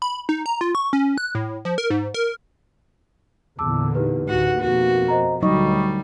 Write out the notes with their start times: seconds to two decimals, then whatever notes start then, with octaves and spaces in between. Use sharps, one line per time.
0.02 B5
0.29 D#4
0.46 A#5
0.61 F4
0.75 C#6
0.93 C#4
1.18 F#6
1.35 A2
1.65 F3
1.78 A#4
1.91 G#2
2.14 A#4
3.59 E2 A#2 D3 A5 D6 E6
3.95 D#4 G4 B4
4.29 A1 D2 A2 F#4 F#5
4.60 F2 B2 A#3 F#4
5.08 C5 D#5 A#5
5.43 D2 F#3 G3 D#4 D#5 C#6